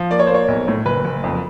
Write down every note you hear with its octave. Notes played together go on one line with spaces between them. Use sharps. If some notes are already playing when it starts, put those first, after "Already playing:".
Already playing: F3
A#3 D5
C#5
C5
A#3 C#5
B1
A2
F#1 B4
F#1
F2